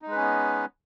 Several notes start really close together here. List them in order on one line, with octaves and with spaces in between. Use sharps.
D#4 G#3 B4 C#4 B3